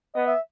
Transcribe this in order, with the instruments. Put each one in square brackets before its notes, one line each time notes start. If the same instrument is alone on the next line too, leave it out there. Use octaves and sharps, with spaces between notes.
[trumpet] B3 [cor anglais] D#5
[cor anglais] E5